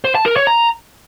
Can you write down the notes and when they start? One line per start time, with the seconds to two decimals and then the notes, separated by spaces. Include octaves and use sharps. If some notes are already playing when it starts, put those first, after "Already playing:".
0.04 C5
0.15 A5
0.26 A#4
0.36 C#5
0.47 A#5